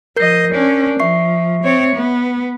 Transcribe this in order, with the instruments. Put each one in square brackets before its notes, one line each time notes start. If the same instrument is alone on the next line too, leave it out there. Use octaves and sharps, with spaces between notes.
[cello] F3 D#5 [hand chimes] A#4 G6 C7
[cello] C#4 D4
[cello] F3 [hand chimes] E5 C#6 C7
[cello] C4 C#5
B3